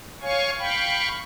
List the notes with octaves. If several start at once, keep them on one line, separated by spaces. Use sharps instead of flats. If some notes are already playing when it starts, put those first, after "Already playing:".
C#5 F5 G#5 C#6
F5 G5 B5 C#6